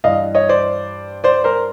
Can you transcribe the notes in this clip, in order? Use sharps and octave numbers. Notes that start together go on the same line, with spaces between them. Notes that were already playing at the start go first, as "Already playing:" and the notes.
G2 E3 D#5 F5
C#5 D#5
C5 D5
C5 D5
A#4 C5